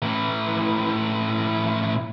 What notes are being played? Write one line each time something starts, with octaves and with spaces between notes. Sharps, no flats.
A2 E3